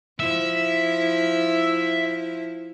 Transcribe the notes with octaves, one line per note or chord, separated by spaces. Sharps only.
F3 E4 E5